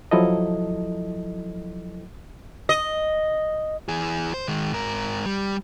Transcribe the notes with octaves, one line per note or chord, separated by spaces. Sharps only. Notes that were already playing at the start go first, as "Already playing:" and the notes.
F3 F#3 E4 A4 D#5
D#5
E3 G#4
C5
D#3 G#3
G#2 A#4
G3